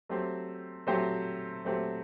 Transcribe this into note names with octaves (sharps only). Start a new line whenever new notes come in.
F#3 A3 C4 G4 C5
F#3 A3 C4 G4 C5
F#3 A3 C4 G4 C5